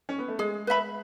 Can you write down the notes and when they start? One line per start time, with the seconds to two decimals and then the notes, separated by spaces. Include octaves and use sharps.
0.09 C#4
0.18 B3
0.28 A3
0.39 G#3 G#4
0.67 B4 E5 B5